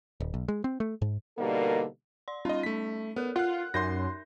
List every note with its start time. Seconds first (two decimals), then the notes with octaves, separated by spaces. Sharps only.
0.20 D#1
0.34 B1
0.48 G#3
0.64 C4
0.80 A3
1.02 G#2
1.38 B2 D3 G3 A#3 D#4 A#4
2.28 D5 C6
2.45 G3 C#4 D#4 F4 D#5
2.63 A3 B6
3.16 B3 A4 A#4
3.36 F4 F#5 F#6
3.74 F#2 D#4 A#4 E5 C6 G6 A#6